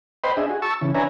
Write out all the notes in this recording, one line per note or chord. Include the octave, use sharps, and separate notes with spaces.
B4 C5 D#5 G5 B5 C6
D4 G#4 D#5 E5
F#4 G#4
A5 C#6 E6
C#3 E3
D4 B4 C#5 E5 G#5 A#5